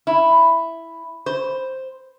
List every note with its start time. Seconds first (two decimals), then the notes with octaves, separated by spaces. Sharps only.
0.07 E4
1.26 C5